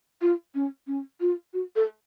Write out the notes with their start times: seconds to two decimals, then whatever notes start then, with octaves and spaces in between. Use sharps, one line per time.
0.22 F4
0.54 C#4
0.87 C#4
1.20 F4
1.53 F#4
1.76 A4